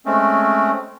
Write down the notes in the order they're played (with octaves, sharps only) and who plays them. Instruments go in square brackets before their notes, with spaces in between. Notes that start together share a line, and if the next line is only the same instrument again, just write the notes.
[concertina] G#3 A3 C4 C#4